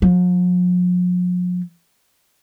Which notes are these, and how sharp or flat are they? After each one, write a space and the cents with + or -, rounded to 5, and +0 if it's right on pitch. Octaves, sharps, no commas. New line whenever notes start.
F3 +45